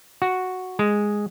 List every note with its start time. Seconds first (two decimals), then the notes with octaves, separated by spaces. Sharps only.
0.22 F#4
0.79 G#3